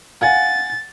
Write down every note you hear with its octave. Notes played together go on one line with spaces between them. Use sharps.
F5 F#5 G#5 A6